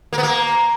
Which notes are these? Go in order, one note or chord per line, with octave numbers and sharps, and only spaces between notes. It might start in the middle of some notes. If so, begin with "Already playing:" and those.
A#3
B3
A#3